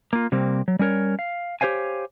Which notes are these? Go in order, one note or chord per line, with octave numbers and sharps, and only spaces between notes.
A#3 F4
C3 G3 A#3 C4
F#3
G3 C#4 A#4 C#5
F5
G4 C5 C#5 F5 G#5